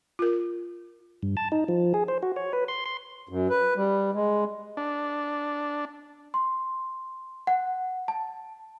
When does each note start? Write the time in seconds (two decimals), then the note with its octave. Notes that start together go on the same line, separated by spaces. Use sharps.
0.19 F4 A#4
1.23 G2
1.37 A5
1.52 D#4
1.68 F3
1.94 G#4
2.08 C5
2.23 F#4
2.36 C#5
2.53 B4
2.68 C6
2.86 C6
3.29 F#2
3.50 B4
3.76 G3
4.13 G#3
4.77 D4
6.34 C6
7.47 F#5
8.08 A5